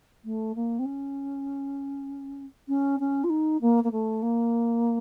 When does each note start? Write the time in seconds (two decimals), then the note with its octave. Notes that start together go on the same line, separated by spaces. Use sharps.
0.25 A3
0.55 A#3
0.79 C4
0.85 C#4
2.68 C#4
3.00 C#4
3.24 F4
3.29 D#4
3.61 A#3
3.84 A#3
3.91 A3
4.22 A#3